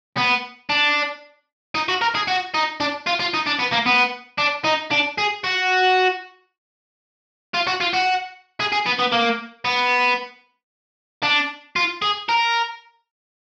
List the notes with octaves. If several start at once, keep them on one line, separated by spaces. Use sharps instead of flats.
B3
D4
D#4
F#4
A#4
G#4
F#4
D#4
D4
F4
F4
D#4
D4
B3
A#3
B3
D4
D#4
D4
G#4
F#4
F4
F#4
F4
F#4
G#4
G#4
B3
B3
A#3
B3
D4
F4
G#4
A#4